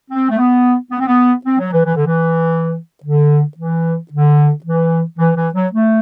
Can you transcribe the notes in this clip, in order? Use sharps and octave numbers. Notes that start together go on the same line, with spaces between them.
C4
A3
B3
B3
C4
B3
C4
F#3
E3
E3
D3
E3
D3
E3
D3
E3
E3
E3
F#3
A3